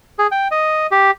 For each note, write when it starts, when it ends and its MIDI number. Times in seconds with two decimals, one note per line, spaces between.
0.19 0.27 68
0.31 0.48 79
0.51 0.87 75
0.91 1.11 67